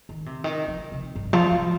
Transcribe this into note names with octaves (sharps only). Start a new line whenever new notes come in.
D#3
C3
D#3
F3
C3
G2
F3
F3